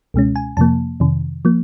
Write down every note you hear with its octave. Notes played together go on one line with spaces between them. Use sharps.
C#2 B2 G#3 C#4
G#5
F2 C3 F3 A#3 A5
F2 C3 D#3
F3 A#3